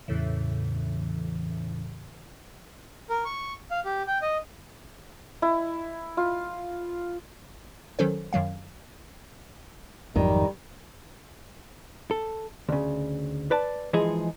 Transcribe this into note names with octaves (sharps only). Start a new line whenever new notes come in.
E2 A2 C#3 E3
A#4
C#6
F5
G4
G5
D#5
E4
F4
D#3 F#3 C#4 A4 C5
F#2 D#3 F#3 F5
G#1 F2 D#3 F#3 G3
A4
D2 C#3
B4 D5 A5
E3 F3 G#3 D#4 G#4